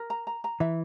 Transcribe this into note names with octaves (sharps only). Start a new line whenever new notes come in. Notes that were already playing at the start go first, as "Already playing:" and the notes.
Already playing: A#4
A#5
A#5
A#5
E3 E5